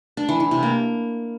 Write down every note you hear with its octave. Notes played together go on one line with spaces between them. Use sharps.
D4
E3
E3
C3
A#3